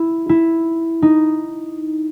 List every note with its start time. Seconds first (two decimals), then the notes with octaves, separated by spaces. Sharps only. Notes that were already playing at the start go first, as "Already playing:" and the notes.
Already playing: E4
0.29 E4
1.02 D#4